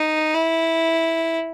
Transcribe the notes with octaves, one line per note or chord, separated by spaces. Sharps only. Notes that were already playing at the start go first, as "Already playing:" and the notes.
Already playing: D#4
E4